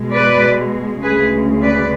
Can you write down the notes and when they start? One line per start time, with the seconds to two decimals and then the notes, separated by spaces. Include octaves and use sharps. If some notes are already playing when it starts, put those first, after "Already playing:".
Already playing: B2 G#3
0.13 B4 D5
1.03 D2 C#3 G#3 G#4 B4
1.62 B4 D5